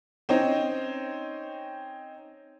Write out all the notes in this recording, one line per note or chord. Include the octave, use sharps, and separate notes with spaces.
C4 C#4 D#4 C5